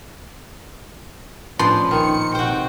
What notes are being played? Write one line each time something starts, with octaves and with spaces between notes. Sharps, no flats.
A2 F3 C#4 D4 B4 C6
A#1 D#3 C#7
C3 F#4 C5 G5